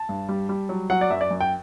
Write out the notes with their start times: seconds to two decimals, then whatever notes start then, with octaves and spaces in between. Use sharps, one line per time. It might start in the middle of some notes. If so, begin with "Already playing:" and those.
Already playing: A5
0.09 G2
0.29 G3
0.49 G3
0.69 F#3
0.90 F#3 F#5
1.01 D5
1.10 F#2 E5
1.21 D5
1.30 F#2
1.41 G5